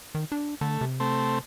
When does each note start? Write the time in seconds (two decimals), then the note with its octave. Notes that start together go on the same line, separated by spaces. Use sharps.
0.15 D#3
0.32 D4
0.61 D3 A3
0.81 C3
1.00 A3 C4